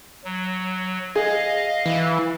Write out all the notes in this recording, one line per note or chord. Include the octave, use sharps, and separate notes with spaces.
F#3
G#4 D#5 F5
E3